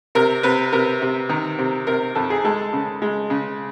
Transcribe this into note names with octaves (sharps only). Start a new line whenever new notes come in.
C3 A#4
C3 B4
C3 A#4
C3
D#3
C3
C3 A#4
F2 A4
G#4
G#3 A4
C#3
G#3
C#3